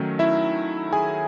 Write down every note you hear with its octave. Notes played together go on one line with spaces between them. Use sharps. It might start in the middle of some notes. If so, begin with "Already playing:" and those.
Already playing: D#3 F#3 A3 C#4
E4 E5
G#4 G#5